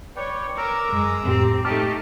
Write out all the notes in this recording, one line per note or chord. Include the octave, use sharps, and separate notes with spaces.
B4 C#5 D5 G5
A#4 A#5 D6 E6
F#2 G#3
F2 A2 C4 G4
A3 D#4 G4 A5 D6 F6